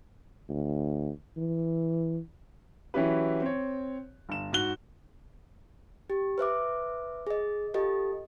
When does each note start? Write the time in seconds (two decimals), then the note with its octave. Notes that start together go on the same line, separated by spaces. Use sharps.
0.50 D2
1.37 E3
2.94 E3 F#3 C#4 E4 G4 B4
3.42 C4 C#5
4.29 G1 E7
4.52 G#2 F#4 F#6 G7
6.10 G4
6.38 B4 C5 E5 D6
7.27 G#4 D#5
7.74 F4 G4 A4 D#5